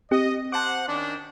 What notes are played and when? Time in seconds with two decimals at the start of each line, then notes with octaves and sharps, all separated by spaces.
0.11 C4 G4 D#5
0.52 C5 F#5 A5 D6
0.88 D#3 C#4 D4